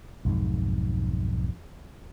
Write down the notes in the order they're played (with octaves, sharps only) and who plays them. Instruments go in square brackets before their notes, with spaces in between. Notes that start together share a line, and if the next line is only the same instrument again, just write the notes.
[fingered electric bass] B1 F2 G#2